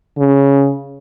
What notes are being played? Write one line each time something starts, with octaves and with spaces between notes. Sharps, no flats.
C#3